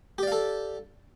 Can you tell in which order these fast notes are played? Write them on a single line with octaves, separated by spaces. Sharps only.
G4 D5 F5 A4